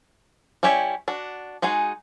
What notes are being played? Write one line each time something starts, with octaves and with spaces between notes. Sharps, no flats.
G3 C#4 E4 G4 C#5
D4 F#4
G#3 D#4 F#4 G#4